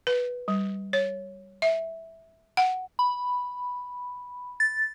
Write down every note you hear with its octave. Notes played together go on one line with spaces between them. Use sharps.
B4
G3
C#5
E5
F#5
B5
A6